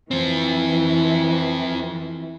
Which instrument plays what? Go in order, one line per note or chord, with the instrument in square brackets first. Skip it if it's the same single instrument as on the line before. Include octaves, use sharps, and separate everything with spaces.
[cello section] E3 [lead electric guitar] F3 C4